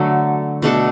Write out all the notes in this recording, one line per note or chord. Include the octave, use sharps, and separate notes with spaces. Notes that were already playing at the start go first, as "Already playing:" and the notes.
Already playing: D3 F#3 A3
B2 A3 D4 A4